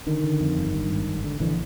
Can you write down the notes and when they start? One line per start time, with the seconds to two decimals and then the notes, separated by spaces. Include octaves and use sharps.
0.07 D3 D#3
0.24 D3
0.40 F2
0.57 G1
0.74 G2
0.90 G#1
1.07 G#1
1.24 D3
1.40 A#1 D3 E3